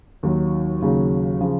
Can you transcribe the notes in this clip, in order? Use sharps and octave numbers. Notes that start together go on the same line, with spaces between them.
D#2 D#3 F#3
D#2 C#3 F#3
C#3 F3